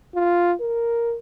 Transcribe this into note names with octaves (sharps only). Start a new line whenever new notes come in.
F4
A#4